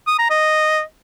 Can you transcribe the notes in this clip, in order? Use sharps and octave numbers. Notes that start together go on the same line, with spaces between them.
D#6
A#5
D#5